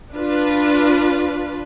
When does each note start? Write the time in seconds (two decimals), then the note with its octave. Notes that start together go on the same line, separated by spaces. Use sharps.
0.15 D4 F4 B4